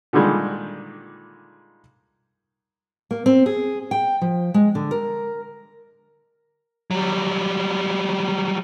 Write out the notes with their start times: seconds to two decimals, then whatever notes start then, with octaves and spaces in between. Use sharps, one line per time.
0.13 A#2 D3 D#3 G3 G#3
3.11 A#3
3.26 C4
3.46 G#4
3.91 G5
4.22 F3
4.54 G#3
4.75 D3
4.91 A#4
6.91 F#3 G3